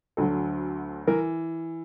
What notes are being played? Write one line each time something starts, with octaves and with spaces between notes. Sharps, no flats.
D2 D3 F#3 A4
E3 A#4